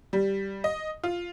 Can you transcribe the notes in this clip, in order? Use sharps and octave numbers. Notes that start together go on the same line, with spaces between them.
G3
D#5
F4